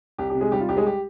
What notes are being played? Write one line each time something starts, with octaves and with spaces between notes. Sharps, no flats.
C2 G4
G4
C3
G#3 G#4
G3 G4
F4
C2 G4
G#3 G#4
G4